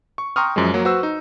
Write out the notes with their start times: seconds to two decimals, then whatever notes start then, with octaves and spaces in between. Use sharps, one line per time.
0.18 C#6
0.36 G5 A#5 C6 C#6 D#6 F6
0.56 F#2 F3 G#3
0.73 F#3 A#3
0.85 F#4 B4 C5 E6
1.03 D#4